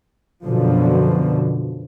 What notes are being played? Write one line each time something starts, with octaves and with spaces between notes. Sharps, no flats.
F#2 B2 D3 F3